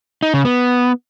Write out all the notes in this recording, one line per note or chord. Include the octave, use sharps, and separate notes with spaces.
D#4
C#3
B3